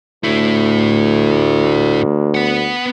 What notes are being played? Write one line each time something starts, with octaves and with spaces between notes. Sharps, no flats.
D2 A3 E4
B3 F#5